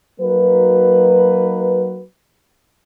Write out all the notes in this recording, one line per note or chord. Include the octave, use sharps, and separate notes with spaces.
F#3 A#3 D#4 F#4 B4